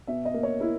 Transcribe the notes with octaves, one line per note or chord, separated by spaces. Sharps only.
B2 E5
D#5
A#3
C#5
E4 A#4